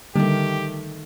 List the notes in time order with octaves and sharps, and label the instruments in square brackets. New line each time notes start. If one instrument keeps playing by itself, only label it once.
[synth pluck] D3 G3 A#3 [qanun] D#3 A3 [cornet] G4